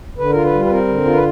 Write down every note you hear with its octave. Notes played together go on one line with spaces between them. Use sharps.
D3 B4
F4 A#4
B4
G3
B4
C4 A#4
D3
F4
B4